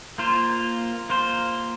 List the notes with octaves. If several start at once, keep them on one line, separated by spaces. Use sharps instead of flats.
A#3 F4 C5
A#3 F4 C5